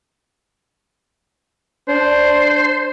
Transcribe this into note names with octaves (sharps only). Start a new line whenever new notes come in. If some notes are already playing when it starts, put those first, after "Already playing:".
D4 C5